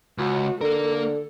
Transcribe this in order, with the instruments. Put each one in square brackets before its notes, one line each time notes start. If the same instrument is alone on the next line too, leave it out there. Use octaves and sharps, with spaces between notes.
[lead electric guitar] C#2 [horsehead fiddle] F#4
[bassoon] D3 [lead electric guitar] A#3 A#4 [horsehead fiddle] A4